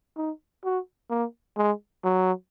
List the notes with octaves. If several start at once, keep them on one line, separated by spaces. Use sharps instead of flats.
D#4
F#4
A#3
G#3
F#3